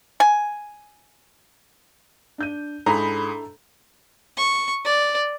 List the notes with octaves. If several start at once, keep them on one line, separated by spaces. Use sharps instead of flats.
G#5
D4 G6 D#7
G#2 D4 E4 G#4 A4 A#5 B5
C#6
D5